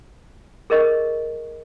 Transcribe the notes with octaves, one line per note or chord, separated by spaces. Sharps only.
G#4 A#4 D#5 C#6